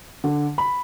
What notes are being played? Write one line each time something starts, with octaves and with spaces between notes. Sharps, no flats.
D3
B5